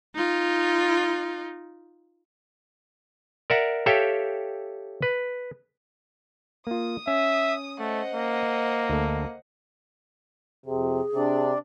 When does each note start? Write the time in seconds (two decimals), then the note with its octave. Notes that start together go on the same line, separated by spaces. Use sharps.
0.15 D#4 F4
3.50 A#4 D5 E5 F#5 A#5
3.86 G4 A4 C#5 E5 F5 G5
5.02 B4
6.67 A#3 F4 D#6
7.07 C#4 E5
7.79 A3 C5 D#5 F#5
8.15 A#3
8.90 D2 A4
10.66 F2 C3 G#4
11.15 C3 D4 D5